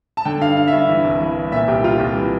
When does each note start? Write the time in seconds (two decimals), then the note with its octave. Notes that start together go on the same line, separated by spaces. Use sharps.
0.17 A5
0.25 D3 G5
0.41 G2 F5
0.57 G2 F5
0.67 E5
0.73 G2
0.78 E5
0.89 E3
1.04 C2
1.21 E3
1.37 E3
1.52 A#2 E5
1.68 C2 G4
1.84 C2 F4
1.99 C2 G4
2.16 E3